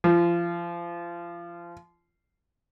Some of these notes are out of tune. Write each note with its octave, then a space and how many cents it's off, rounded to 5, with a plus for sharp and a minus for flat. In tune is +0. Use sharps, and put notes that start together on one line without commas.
F3 -25